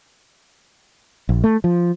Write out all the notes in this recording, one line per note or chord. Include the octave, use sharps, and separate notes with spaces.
A#1
A3
F3